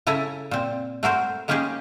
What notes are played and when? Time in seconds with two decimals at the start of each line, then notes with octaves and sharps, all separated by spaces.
0.07 C#3 E4 A4 G#5 A#5
0.51 A#2 C4
1.03 A3 F#4 A#4 C5
1.48 G#3 A#3 C#4 D#4 G4 G#4